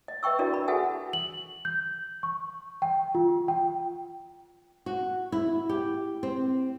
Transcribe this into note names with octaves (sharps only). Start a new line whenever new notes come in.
D#5
B4 E5 G5 C#6 E6
D4 E4 F#4 A#4 D5 D#5
B5
F#4 G#4 A4 E5 F#5 G#5
F#7
G6
C#6
G5
F4
G5
F#4
E4
G4
C4